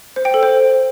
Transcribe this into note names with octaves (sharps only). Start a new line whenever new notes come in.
C5
G5
A4
C5